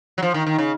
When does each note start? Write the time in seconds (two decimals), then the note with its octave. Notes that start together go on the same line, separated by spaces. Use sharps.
0.18 F#3
0.22 F3
0.34 D#3
0.47 D#3
0.58 C#3